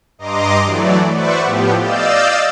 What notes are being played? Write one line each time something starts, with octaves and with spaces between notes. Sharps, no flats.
G2 D#5 A#5 C6 D6
E3 F#3 A3 D5
B4 C5 D5 E5 F#5 C#6
A2 F3 B3 G4
D5 D#5 F5 E6 G6 A6